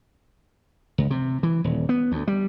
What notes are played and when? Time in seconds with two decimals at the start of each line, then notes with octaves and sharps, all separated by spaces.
0.98 C#2
1.10 C3
1.43 E3
1.64 D#1
1.89 B3
2.12 D2
2.28 G3